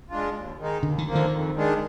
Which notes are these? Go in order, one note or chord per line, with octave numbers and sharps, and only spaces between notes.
G#3 D4 F4
D#2
D#3 G#3 D#4
D#2 D3
D#3
D3 F3 A#3
D#3
F2
D#3 G#3 D4